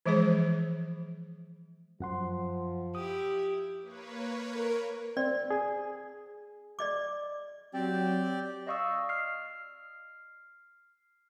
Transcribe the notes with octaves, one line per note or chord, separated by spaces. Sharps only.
E3 F3 G#3 G#4 C5
F#2 F3 F#5 C6
E4 G4 D#6
A#3 B4 C#5
A#4
C4 D5
G#4
D5 D#5 D6
F#3 C4 G4 D5
D5 D#5 F5 C#6 D#6 E6
F6 C7